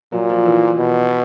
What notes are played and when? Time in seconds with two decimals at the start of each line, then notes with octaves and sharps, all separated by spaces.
0.12 A#2 F#3
0.29 F3
0.46 E3
0.62 F3
0.78 B2